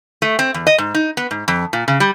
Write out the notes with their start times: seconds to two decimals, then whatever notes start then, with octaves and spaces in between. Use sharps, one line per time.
0.22 A3
0.39 C4
0.54 E2
0.67 D#5
0.78 G#2
0.94 D#4
1.17 B3
1.31 G#2
1.48 F2
1.73 A#2
1.88 C#3
2.00 G3